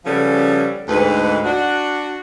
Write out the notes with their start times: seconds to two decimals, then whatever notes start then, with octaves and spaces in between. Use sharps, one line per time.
0.04 C#3 F3 G3 B3 C#4 A4
0.88 D2 G#2 B4
1.44 D4 F#4